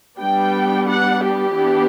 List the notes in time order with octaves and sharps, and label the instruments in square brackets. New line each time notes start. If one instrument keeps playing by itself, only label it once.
[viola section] G3 B3 D4 G5
F#5
G4
E3 B3 D4